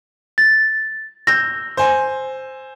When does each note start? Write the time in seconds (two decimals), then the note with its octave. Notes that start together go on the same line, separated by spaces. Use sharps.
0.38 A6
1.27 E6 G6 A#6
1.77 C5 G#5